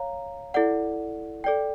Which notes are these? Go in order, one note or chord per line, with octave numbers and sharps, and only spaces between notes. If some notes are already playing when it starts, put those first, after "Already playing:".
Already playing: C#5 F5 A#5
E4 A4 D5 F#5
A4 D5 G5